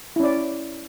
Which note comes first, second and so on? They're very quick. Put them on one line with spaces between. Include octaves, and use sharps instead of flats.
E4 C#4 D5